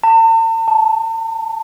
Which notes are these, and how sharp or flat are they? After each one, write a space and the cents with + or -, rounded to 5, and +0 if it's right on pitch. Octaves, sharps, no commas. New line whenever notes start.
A5 +45
A5 -10